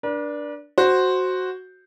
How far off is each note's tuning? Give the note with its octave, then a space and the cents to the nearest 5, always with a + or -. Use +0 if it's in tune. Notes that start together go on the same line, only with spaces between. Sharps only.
D4 +0 B4 -45
F#4 +0 C5 +0